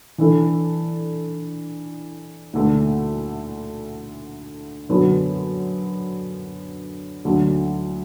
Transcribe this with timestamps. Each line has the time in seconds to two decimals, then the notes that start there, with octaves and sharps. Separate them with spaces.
0.18 E3 D4 A4
2.53 D2 D3 A3
4.89 F#2 D3 F#3 B3
7.25 D2 D3 F#3